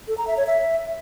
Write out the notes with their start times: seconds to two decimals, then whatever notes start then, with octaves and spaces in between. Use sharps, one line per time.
0.08 A4
0.18 A#5
0.27 E5
0.37 C#5
0.47 E5